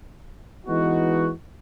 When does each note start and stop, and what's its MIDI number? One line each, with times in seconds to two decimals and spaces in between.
0.67 1.29 52
0.67 1.29 56
0.67 1.29 59
0.67 1.29 63
0.67 1.29 66